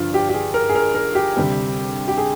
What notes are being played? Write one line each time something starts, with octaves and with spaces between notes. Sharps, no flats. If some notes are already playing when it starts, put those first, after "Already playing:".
Already playing: G2 D3 F3 F4
G4
G4
G#4
A#4
G#4
A#4
A#4
G4
D2 C3 G3 C4
G4
G#4